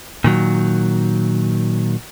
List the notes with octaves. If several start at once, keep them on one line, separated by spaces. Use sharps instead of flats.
A#2 D#3 F#3